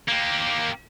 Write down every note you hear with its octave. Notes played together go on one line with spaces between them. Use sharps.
A#3 G4